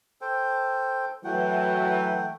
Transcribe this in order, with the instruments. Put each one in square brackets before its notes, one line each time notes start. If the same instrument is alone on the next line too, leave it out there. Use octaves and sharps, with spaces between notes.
[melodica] A4 C5 G5
[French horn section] E3 F#3 [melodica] A3 F#5 G5